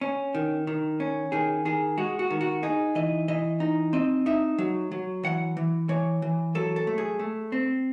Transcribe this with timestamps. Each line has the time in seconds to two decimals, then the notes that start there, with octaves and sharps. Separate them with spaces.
0.01 C#4
0.35 D#3
0.67 D#3
1.00 C#4
1.32 D#3 G#4
1.65 D#3 G#4
1.98 G#3 F#4
2.19 F#4
2.31 D#3
2.41 F#4
2.63 D#4 G#4
2.95 E3 D#5
3.28 E3 D#5
3.60 D#4
3.93 C4 D#5
4.26 D#4 E5
4.58 F#3
4.92 F#3
5.23 E3 F#5
5.57 E3
5.89 E3 C#5
6.22 E3
6.55 F#3 A4
6.76 A4
6.87 A3
6.98 G#4
7.19 A3
7.52 C4